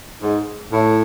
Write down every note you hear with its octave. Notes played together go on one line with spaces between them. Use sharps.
G#2
A2